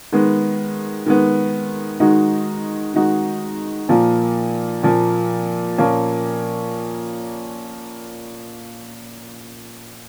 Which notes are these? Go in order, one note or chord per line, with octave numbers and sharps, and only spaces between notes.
D#3 G#3 B3
D#3 G#3 B3
D#3 G#3 D#4 F#4
D#3 G#3 D#4 F#4
A#2 F3 A#3
A#2 F3 A#3
A#2 F3 A#3 C#4